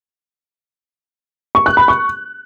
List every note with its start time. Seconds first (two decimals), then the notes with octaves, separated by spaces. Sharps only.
1.55 C#6
1.66 F#6
1.77 B5
1.88 C#6